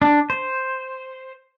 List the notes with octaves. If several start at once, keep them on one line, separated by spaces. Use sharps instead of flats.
D4
C5